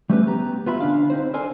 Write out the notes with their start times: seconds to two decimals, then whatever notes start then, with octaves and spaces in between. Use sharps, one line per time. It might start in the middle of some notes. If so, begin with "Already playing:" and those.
0.10 G3 A3 C4 C#4 G4 B4
0.26 B3 G4 A#5
0.66 B3 F4 E5 B5
0.80 D3 C#4 D4 F5
1.10 C4 D#4 C5
1.34 A4 A#4 C5 D5 G#5